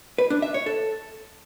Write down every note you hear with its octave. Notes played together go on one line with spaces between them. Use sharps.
B4
D4
E5
C#5
A4